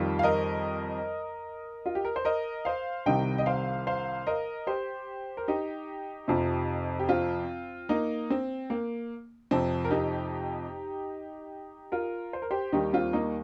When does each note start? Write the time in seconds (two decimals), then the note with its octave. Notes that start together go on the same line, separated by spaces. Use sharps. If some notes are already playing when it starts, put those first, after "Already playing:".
Already playing: F2 D#3 G3 F4
0.19 F5
0.23 A#4 D#5
1.86 F4
1.95 G4
2.05 A#4
2.16 C5
2.25 A#4 D#5
2.65 C5 F5
3.06 C2 C3 D#3 G3 D#5 G5
3.38 D#5
3.46 C5 F5
3.87 C5 F5
4.27 A#4 D#5
4.67 G4 C5
5.37 A#4
5.48 D#4 G4
6.28 F2 C3 F3
6.99 G4
7.09 C4 F4
7.89 A#3 D#4
8.30 C4
8.70 A#3
9.51 F2 C3 F3 C4
9.85 A#4
9.90 D#4 G4
11.92 F4 A#4
12.33 C5
12.42 A#4
12.51 G4 C5
12.72 D#2 D#3 G3 D#4 G4
12.93 C4 F4
13.13 A#3 D#4